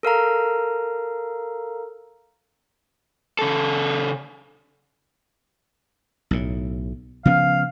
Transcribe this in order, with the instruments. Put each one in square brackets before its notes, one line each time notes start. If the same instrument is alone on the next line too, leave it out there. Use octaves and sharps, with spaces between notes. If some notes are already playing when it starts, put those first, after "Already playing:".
[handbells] A4 A#4 F5 A#5
[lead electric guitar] C#3 A4
[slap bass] B1 A2
[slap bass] C#3 F3 B3 [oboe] F5